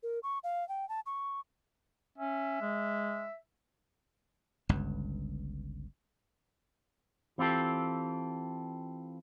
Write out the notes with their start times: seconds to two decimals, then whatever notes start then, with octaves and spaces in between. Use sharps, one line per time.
0.03 A#4
0.23 C#6
0.44 F5
0.69 G5
0.89 A5
1.06 C#6
2.18 C#4 E5
2.61 G#3
4.69 G1 C#2 G2
7.38 E3 C4 F4 G4 A4